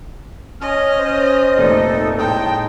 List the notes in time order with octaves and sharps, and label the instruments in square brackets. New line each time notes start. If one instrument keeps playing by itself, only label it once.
[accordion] C#4 F6 [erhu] D#5
[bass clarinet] C5
[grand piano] F1 A#2 D5 [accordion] D#4 A4
[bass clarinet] A2 [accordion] G#3 D#4 [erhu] G5 [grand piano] A5 D#6